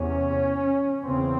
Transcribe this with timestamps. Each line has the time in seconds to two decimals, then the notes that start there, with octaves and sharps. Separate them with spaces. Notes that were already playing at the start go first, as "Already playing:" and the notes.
Already playing: E2 C3 C#4
1.05 E2 C#3 C4